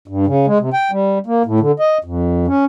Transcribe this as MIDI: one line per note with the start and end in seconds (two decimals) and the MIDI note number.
0.08 0.26 43
0.27 0.46 49
0.47 0.58 56
0.60 0.70 48
0.73 0.91 79
0.91 1.18 55
1.26 1.43 58
1.46 1.60 45
1.60 1.72 50
1.79 1.98 75
2.04 2.46 41
2.47 2.65 61